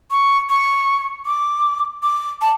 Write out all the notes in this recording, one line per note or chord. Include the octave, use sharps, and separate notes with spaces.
C#6
C#6
D6
D6
A5